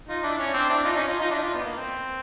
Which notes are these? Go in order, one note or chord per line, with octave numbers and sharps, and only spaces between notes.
D#4 F4
D4 E4
C#4
C4 D4
D4 E4
D#4 F4
C#4 D#4
D#4 F4
D#4 F4
D4 E4
D#4 F4
B3
A#3
C4